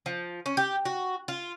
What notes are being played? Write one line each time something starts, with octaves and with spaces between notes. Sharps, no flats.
F3
C#4
G4
F#4
F4